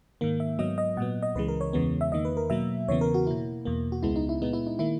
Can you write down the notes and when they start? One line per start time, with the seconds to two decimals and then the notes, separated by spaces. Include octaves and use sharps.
0.21 G#2 D#3 A#3
0.40 E5
0.59 G#2 F#3 B3 D#5
0.78 D#5
0.97 A#2 F#5
1.00 F#3 B3
1.23 D#5
1.35 C#2 C#3 E3 G#3 B4
1.48 A#4
1.61 C#5
1.73 E2 C#3 E3 G#3 B3
2.01 E5
2.12 E2 D#3 A#3 D#5
2.25 B4
2.37 A#4
2.50 B2 F#3 A#3 E5
2.88 E2 C#3 E3 B3 C#5
3.01 A#4
3.14 F#4
3.27 B2 A#3 E4
3.65 E2 B2 A#3
3.92 F#4
4.03 C#2 C#3 G#3 B3 E4
4.16 D#4
4.29 E4
4.42 A#2 G#3 B3 D#4
4.53 E4
4.67 D#4
4.79 D#3 A#3 E4